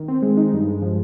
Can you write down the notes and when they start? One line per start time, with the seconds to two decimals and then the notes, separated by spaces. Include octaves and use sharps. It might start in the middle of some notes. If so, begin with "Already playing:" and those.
Already playing: D#3
0.08 C4
0.22 G#3
0.37 D#4
0.53 G2
0.68 G#3
0.82 F3